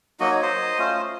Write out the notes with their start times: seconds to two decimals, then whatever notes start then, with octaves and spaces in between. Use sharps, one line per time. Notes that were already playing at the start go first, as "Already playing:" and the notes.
0.20 F#3 A#3 D#4 F#4 D#5
0.31 C#5
0.42 C5 D#5
0.79 A3 C#4 F4